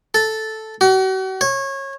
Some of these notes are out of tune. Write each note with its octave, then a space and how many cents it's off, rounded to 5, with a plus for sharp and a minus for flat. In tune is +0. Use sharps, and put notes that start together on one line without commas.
A4 -5
F#4 +40
C#5 -25